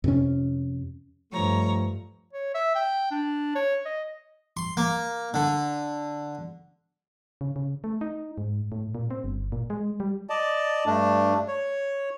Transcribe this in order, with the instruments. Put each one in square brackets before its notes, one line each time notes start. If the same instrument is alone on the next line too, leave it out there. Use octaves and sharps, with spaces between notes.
[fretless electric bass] F2 C3 C#4
[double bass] G2 [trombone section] F3 A3 [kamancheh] C#5 A#5
[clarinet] C#5
E5
G5
D4
C#5
D#5
[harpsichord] C6
A#3
D3
[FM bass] C#3
C#3
A3
D#4
G#2
A2
A#2
C4
G1
A#2
G#3
G3
[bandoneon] D5 D#5 A5
G2 A3 D4
C#5